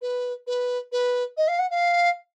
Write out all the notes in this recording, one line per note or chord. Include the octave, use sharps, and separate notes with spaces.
B4
B4
B4
D#5
F5
F#5
F5